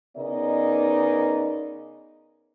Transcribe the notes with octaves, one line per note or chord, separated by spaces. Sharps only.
C#3 B3 D#4 A#4 D5 D#5